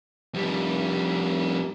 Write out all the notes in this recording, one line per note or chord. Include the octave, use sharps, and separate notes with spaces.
F2 G3